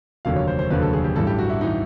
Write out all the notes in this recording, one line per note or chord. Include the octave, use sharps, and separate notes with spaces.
F1 D#2 D3 F#3 F5
C#5
C5
C5
F1 D#2 D3 F#3 B4
A4
G#4
G4
A1 G2 E3 A4
G4
F#4
E4
E3 D#4